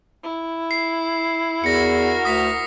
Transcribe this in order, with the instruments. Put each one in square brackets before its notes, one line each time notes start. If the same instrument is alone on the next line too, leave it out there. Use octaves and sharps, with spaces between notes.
[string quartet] E4
[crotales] C7
[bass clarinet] E2 [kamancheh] F#4 A#4 [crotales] A#6 C#7
[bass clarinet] D2 [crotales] D#6 B6